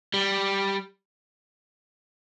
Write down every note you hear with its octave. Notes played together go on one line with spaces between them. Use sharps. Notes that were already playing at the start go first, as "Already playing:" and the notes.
G3